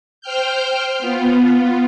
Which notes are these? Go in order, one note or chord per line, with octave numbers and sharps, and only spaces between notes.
C5 G5 F6 G6
B3 F4